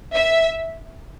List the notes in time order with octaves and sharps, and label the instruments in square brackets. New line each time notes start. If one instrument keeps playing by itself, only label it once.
[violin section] E5